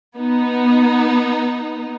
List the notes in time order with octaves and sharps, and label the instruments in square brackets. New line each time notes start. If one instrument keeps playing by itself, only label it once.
[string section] B3 D#4